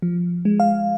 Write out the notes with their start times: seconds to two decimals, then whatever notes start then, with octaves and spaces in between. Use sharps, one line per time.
0.02 F3
0.45 G#3
0.60 F5